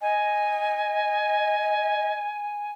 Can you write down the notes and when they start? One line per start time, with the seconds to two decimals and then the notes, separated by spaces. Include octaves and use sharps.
0.01 D#5 G#5